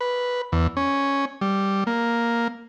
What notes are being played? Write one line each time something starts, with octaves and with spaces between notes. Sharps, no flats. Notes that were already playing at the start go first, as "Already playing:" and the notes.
B4
E2
C#4
G3
A#3